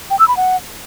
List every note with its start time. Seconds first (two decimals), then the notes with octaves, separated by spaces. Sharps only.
0.10 G5
0.19 E6
0.28 B5
0.37 F#5